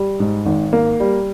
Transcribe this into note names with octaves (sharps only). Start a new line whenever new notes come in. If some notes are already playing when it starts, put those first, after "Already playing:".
Already playing: G3
G#2
G#1
A#3
G3